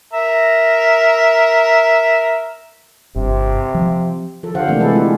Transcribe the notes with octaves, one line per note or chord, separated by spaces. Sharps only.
A#4 E5 A#5
G1 C3
F3
F3 A4
D3 D4 G4 C5 F5 F#5
C3 E3 A3 A#3 C4 D4
C3 E3 G#3 G#4 A4 B4
F4